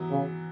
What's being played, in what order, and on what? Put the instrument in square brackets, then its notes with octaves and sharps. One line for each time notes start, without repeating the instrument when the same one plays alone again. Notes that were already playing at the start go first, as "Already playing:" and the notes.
Already playing: [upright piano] E3 F#3 B3
[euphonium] C#3